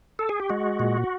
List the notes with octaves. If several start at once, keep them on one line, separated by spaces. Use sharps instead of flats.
A4
G#4
G4
G#3 F#4
A#2